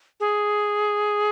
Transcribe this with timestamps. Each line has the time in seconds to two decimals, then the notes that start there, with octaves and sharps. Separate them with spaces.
0.20 G#4